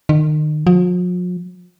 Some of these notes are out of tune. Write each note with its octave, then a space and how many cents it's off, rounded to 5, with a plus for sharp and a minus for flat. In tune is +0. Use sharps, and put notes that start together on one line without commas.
D#3 -35
F3 +45